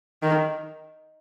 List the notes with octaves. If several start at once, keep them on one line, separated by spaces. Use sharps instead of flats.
D#3